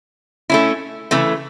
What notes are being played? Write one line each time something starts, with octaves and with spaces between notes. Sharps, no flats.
A3 C#4 E4
C#3 E3 A3